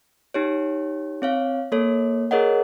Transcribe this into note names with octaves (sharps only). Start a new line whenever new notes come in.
D#4 G4 C#5
C4 C#5 F5
A#3 A4 C#5
G#4 A#4 C#5 D#5 F#5